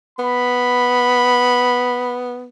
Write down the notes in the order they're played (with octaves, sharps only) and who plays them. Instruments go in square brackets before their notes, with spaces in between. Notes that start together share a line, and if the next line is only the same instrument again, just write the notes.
[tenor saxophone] B3 [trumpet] B5